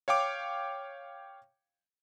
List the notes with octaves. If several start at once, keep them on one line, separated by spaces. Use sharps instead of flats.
C#5 F5 G5 D6